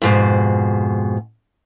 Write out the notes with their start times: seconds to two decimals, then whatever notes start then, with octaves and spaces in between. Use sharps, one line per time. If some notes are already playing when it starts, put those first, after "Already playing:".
0.02 F2 G#2 B2